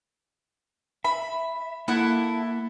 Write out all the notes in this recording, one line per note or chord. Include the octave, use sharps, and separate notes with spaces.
E5 B5
A#3 E4 A4 F#5